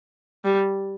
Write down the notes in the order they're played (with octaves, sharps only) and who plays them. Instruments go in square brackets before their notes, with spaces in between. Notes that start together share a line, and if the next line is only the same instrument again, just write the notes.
[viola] G3